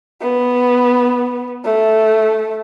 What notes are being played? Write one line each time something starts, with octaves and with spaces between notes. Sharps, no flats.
B3
A3